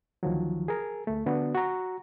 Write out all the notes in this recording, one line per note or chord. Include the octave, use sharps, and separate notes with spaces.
D2 D#3 F3 F#3
G#4 A#4
D2 A3
D3 B3 D4 F#4
F#4 A#5